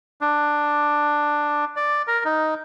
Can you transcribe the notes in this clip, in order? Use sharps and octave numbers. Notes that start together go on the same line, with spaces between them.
D4
D5
A#4
D#4